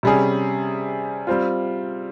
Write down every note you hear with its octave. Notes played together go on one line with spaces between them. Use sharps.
C3 G3 C#4 G#4
G3 C4 F4